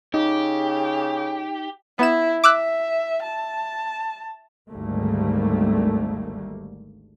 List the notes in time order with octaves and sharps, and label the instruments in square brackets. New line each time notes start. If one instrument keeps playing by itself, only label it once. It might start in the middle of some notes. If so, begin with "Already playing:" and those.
[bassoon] C#3 [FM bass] D#4 [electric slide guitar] G4
[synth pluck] B3 E7 [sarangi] E4
[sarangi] E5 [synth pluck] D6 E6 F#6
[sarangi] A5
[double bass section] G#1 D2 G#2 G3 A3 A#3